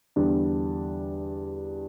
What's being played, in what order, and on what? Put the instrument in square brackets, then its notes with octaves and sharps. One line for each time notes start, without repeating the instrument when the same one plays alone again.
[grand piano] E2 D3 G3 D4